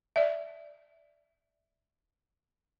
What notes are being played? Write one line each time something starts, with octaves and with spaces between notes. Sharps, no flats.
D5 E5